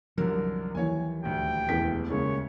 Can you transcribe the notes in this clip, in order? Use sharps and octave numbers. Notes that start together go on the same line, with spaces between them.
C2 F#2 D3 F3 F#3 A#4
D#2 E3 C#5 G#5
D#1 D2 G5
E1 E2 B6
C#3 G#3 A#3 C#5